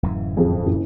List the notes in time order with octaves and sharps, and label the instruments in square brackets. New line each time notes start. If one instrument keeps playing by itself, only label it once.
[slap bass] D1 F#2 E3
[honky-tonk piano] F2 G#4
F#1